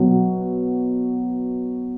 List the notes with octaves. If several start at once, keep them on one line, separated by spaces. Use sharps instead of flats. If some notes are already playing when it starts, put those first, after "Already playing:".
Already playing: B2 F#3